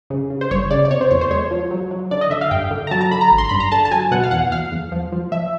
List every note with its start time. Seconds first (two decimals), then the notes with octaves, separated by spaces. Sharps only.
0.10 C#3
0.30 C#3
0.41 C5
0.51 G1 C#5
0.71 C#3 D5
0.85 D5
0.91 C3 C#5
1.01 C5
1.11 E2 C#5
1.21 C5
1.31 G#3 C#5
1.51 F3
1.71 F#3
1.91 F#3
2.11 D3 D5
2.21 D#5
2.31 D3 E5
2.41 F5
2.51 G2 G5
2.71 D3
2.87 A#5
2.91 F#3 A5
3.01 A#5
3.11 D3 B5
3.21 A#5
3.31 G#1
3.38 C6
3.49 G2 B5
3.60 A#5
3.72 D3 A5
3.85 A5
3.91 F#3 G#5
4.11 B2 F#5
4.23 F5
4.31 E2 F#5
4.52 E2 F5
4.72 E2
4.92 F3
5.12 F3
5.32 F3 E5